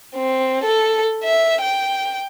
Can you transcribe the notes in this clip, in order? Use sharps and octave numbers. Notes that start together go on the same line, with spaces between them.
C4
A4
E5
G5